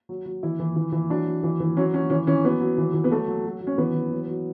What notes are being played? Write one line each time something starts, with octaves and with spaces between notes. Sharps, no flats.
F#3
F#3
E3 E4
E3
E3
E3
F#3 D4
F#3
E3
E3
F#3 C#4
F#3 C#4
E3 C#4
E3 C#4
F#3 B3
F#3
E3
E3
B3
F#3 A3
F#3
F#3
F#3
C#4
E3 B3
E3
F#3
F#3